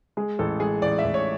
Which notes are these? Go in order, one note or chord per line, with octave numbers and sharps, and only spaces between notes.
G#3 G#4
A1 A4
G#3 G#4
A1 D5
E5
A1
C#5